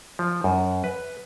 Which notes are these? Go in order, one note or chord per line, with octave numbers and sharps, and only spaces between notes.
F3
F#2
B4